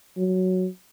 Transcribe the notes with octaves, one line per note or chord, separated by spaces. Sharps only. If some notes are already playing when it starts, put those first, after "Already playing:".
F#3